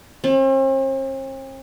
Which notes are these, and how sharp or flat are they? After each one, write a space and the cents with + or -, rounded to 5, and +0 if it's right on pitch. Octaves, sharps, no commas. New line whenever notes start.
C4 +45